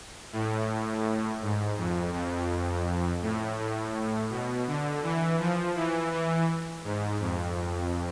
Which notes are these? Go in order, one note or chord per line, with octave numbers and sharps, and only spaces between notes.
A2
G#2
F2
F2
A2
A2
B2
D3
E3
F3
E3
E3
G#2
F2